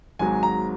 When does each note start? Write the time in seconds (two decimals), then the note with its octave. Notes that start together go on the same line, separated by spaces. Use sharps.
0.19 G#1 G#2 F#3 G#5
0.43 A#5